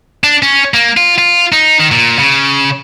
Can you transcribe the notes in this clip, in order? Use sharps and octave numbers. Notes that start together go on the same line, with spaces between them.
D4
C#4
A#3
F4
F4
D#4
D#3
A#2
C#3